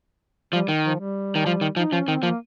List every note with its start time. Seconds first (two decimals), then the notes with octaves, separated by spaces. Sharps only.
0.53 F3 G3
0.68 D#3
0.85 F3
1.00 G3
1.35 D#3
1.46 F3
1.61 D#3
1.76 F3 D#4
1.92 F3 C#4
2.07 D#3 C4
2.23 F3 A#3